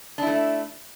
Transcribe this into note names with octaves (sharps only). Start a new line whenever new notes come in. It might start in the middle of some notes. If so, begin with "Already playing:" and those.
A3 D4 E4